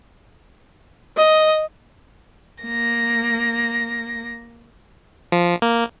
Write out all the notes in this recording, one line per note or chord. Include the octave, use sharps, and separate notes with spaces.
D#5
A#3 A#6
F3
A#3